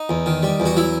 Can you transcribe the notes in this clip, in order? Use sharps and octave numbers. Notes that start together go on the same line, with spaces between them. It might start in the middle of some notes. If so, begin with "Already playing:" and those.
Already playing: D#4
E2
D#3
G3
E2
F#4
F#3 E4